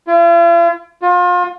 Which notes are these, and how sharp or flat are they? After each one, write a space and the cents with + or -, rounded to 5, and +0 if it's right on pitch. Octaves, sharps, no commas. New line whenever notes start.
F4 -45
F4 +35